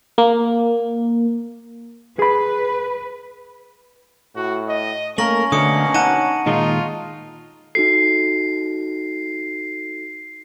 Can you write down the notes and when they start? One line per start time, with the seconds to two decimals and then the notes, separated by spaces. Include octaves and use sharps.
0.18 A#3
2.19 G#4 B4 B5
4.36 A2 F#4
4.68 D#5
5.18 A3 A#3 C#4 A#4 C#6 A#6 F#7
5.52 B2 D3 F#3 A3 A#3 D4 D#6 C#7
5.94 D#4 F#5 A5 A#5 D#7
6.46 A#2 D#3 G#3 D#4 F4
7.75 D#4 F#4 A4 C7